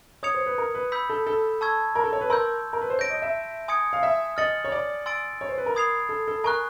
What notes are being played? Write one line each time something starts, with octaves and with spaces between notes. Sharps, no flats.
C#5 D#6 G#6 C#7 F7
C5
B4
A#4
B4
B5 E6 G6 B6
A4
A4
A5 C#6 E6 G#6
A#4
A4
C#5
B4
A#4 C6 E6 G6
A#4
B4
C5
C#5 G6 A#6 D7
D#5
E5
G#5 C6 D#6 G#6 C#7
F5
E5
D#5 F6 A6 C#7 F#7
C#5
D5
G#5 C6 E6 A6 D7
C#5
C5
B4
A#4
B5 D#6 G#6 C7 F7
A4
A4
A#4 G#5 C#6 F#6